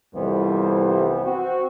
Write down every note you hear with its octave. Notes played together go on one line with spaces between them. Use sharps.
C2 F2 E3 G3 B3 C5
C4 F#4